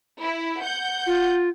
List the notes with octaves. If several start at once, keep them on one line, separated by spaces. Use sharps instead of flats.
E4
F#5 G6
F4